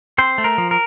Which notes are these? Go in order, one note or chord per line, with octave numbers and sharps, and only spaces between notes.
C4 C5
A3
A#4
F3
A#4